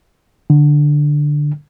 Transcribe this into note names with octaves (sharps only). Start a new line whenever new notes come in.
D3